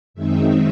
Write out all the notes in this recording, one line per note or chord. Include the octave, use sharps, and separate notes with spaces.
F#2 D#3 G#3 C4 D#4 E5